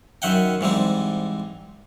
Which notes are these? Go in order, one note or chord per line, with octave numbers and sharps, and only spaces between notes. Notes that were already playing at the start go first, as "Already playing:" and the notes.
F#2 D#3 E5 F#5 G5
G#2 E3 G3 C4